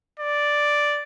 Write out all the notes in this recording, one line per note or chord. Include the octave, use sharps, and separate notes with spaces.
D5